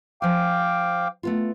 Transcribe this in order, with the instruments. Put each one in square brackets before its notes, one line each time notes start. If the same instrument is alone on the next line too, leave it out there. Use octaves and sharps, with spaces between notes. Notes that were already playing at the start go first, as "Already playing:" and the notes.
[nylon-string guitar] F3 G#5 [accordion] F5 G5 D6
[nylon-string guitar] A3 B3 F4